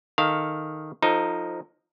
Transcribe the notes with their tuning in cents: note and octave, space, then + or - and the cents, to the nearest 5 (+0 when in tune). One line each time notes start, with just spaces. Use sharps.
D#3 +0 A4 +0 F5 +0
F3 +5 D#4 +0 A4 +30